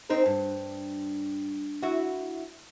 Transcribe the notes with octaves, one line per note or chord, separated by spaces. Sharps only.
C4 D#4 A#4
G2
E4 F#4